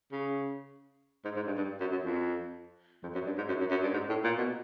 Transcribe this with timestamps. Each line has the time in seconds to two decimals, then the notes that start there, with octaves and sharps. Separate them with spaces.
0.12 C#3
1.25 G#2
1.36 G#2
1.47 G2
1.57 G2
1.80 F#2
1.92 F#2
2.03 F2
3.03 F2
3.15 F#2
3.26 G2
3.38 G#2
3.48 F#2
3.60 F#2
3.71 F#2
3.83 G2
3.93 G#2
4.09 A2
4.24 A#2
4.38 B2